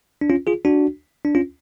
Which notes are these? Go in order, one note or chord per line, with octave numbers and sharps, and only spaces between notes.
D4
C#4 F4
F4 G#4
D4 F#4
D4
C#4 F4